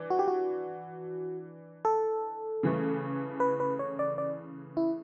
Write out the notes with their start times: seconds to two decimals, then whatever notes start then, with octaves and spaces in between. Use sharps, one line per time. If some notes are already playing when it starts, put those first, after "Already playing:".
Already playing: E3 D4
0.10 F#4
0.19 G4
0.28 F#4
1.85 A4
2.63 C#3 E3 A3
3.40 B4
3.60 B4
3.79 C#5
3.99 D5
4.18 D5
4.77 E4